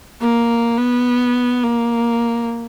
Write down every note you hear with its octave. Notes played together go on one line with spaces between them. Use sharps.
A#3
B3
A#3